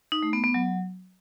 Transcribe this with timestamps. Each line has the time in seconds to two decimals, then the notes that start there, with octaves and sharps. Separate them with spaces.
0.12 D#4
0.23 A3
0.33 B3
0.44 B3
0.54 F#3